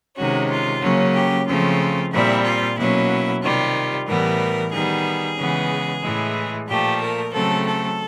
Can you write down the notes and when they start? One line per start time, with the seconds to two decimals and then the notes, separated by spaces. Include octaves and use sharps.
0.17 C3 D#3 G#3 C#4 F#4
0.50 F4
0.82 C#3 F#3 A#3 C#4
1.15 G4
1.47 C#3 F3 A3 C4 F4
2.12 A#2 G3 C4 E4
2.44 F4
2.77 B2 F#3 A#3 C#4 E4
3.42 C3 D#3 G3 F4
4.07 A2 E3 G3 B3 A#4
4.73 D#3 G3 B3 G#4
5.38 C#3 E3 G#3 B3
6.03 A2 E3 G#3
6.68 A#2 F3 A3 G4
7.00 A#4
7.33 C#3 F#3 A3 C4 A4
7.66 A4